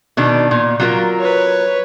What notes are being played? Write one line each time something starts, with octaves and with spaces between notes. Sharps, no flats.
B2 D#3 D4
A#2
F#3 F4 A#4
B4 C#5